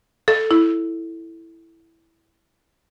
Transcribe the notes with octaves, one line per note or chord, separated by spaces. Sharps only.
A4
E4